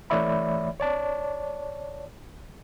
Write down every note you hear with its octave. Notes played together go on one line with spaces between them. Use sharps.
E3 A3 C#5 D5 E5 B5
C#5 D5 A5